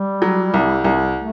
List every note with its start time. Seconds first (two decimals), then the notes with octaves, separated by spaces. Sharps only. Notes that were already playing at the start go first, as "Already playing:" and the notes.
Already playing: G3
0.22 F#3
0.54 C2
0.84 C2
1.17 A3